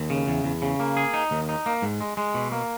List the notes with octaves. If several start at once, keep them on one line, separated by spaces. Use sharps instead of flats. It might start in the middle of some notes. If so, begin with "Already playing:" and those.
Already playing: D#2
C#3
E2
E2
C#3
A#3
G#4
D#4
D#2
D#4
A#3
G#2
G#3
G#3
B2
A#3